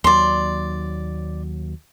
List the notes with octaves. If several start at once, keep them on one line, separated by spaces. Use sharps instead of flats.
D#2 F#3 D5 C6